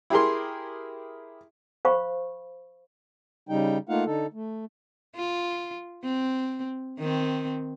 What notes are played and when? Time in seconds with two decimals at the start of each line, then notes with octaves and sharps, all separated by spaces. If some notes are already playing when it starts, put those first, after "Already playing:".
0.10 E4 G4 G#4 A#4 C6
1.85 C5 F5 B5 C#6
3.49 C#3 G3 D#4 G5
3.89 A3 A#3 D#4 F4 F5 F#5
4.05 D3 D#4 A4
4.33 A3
5.16 F4
6.03 C4
6.99 D#3 C4